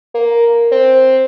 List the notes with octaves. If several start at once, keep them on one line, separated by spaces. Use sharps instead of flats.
A#3
C4